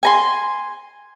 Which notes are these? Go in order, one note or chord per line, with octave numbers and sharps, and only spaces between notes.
G#5 A#5 C6